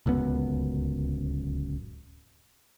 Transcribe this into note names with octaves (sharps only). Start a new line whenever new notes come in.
D1 C#2 F#2 B3